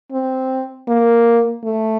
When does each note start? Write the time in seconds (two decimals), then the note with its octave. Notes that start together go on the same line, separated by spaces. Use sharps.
0.12 C4
0.88 A#3
1.64 A3